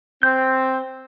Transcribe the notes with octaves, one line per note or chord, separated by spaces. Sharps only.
C4 G6